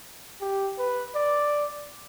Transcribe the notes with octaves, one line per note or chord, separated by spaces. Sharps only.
G4
B4
D5